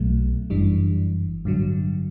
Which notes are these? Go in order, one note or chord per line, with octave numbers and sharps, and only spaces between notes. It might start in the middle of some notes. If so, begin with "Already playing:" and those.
Already playing: B1 B2 F#3 A3
G1 F#2 E3 G3 D4
A1 G2 D3 F#3